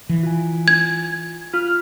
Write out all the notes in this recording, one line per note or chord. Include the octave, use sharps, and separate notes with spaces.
E3
F4 G#5
G#6
F4 F6